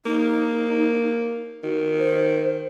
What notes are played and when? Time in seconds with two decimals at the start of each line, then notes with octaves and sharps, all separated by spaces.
0.06 A#3 D#4
1.63 D#3 F#4
1.98 C5